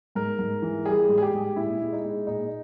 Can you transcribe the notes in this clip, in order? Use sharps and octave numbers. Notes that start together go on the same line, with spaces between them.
G#2 A#4
G#2
E3
G3 G#4
G#2
G#4
G4
G#2
A#2 E4
G#3
D#4
G#3
A#2 D#4